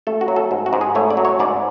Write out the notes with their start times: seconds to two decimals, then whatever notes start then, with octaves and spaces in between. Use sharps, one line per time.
0.07 A3 A4
0.21 F#4
0.28 F#3
0.36 A4
0.51 G#2
0.66 F#4
0.73 G#2
0.81 G#4
0.95 A3 C#5
1.10 D5
1.17 F#3
1.25 C#5
1.39 G#2 D5